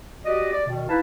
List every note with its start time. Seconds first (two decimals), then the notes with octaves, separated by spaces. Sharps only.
0.24 F#4 G4 D5 D#5
0.51 D5
0.67 B2 D#3
0.88 D#4 E4 B4 F5 A5